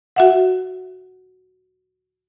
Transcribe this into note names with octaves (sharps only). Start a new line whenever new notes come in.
F#4 E5 F#5